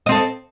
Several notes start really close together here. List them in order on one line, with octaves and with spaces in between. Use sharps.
D#5 C4 A4